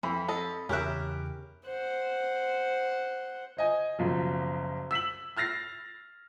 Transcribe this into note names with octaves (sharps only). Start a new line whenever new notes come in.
F2 E3 B5
A4 D#5
E2 C#3 C#4 G4 A#4 E5 F#6
C5 F#5
C5 D#5 G#5
F#1 B1 F3
E6 B6 E7 F#7
E6 F6 A6 A#6 C7